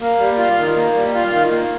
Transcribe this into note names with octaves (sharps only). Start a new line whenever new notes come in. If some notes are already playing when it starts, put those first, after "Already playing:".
A#3
G3
F4
D#3
A#3
G3
F4
D#3
A#3